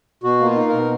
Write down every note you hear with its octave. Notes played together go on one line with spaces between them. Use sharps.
B2 F#4
A#3
F4
D#4
A#4
B2